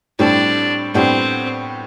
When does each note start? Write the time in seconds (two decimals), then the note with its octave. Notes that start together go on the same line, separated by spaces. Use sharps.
0.19 A2 G3 C4 D4
0.94 A2 G3 B3 C4 D4 G4